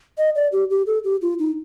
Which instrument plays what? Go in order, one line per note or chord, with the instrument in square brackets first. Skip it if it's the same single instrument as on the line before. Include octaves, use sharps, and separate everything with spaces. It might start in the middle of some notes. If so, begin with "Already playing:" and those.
[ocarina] D#5
D5
G4
G4
A4
G4
F4
D#4